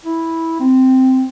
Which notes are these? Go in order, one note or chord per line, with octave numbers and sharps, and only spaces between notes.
E4
C4